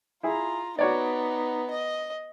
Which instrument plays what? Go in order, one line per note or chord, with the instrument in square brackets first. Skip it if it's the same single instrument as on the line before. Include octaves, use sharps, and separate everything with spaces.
[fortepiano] E4 G#4 [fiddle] F4 A#5
[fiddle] B3 D#4 [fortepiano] F#4 C#5 D5
[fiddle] D#5